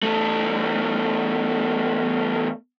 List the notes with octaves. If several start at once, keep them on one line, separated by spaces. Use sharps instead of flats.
E2 A3